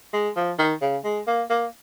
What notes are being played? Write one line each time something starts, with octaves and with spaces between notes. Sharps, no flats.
G#3
F3
D#3
C#3
G#3
A#3
A#3